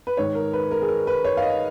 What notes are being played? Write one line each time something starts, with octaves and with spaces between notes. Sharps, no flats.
B4
G#2 D#3 C#5
A#4
B4
A#4
G#4
A#4
B4
C#5
F5
D#5